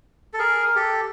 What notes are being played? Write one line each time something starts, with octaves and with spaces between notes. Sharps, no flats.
A4
G#4 A#4
A#4
G4 A4